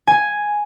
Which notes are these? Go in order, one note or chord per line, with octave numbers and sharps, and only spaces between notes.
G#5